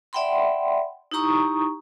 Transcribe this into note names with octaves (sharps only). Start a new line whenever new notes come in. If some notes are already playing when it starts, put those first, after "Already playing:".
D5 E5 F#5 G5 B5 C6
D#4 E4 G4 A#5 C#6 D#6